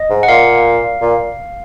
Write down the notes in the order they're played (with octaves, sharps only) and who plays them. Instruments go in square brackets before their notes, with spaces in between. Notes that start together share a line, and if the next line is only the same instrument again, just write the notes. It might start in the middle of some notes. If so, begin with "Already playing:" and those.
Already playing: [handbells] D#5
[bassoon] G#2
[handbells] F#5
[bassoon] A#2 [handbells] F5
[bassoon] A#2